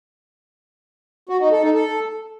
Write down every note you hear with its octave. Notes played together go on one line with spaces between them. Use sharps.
F#4
D#4
A4
D#4
A4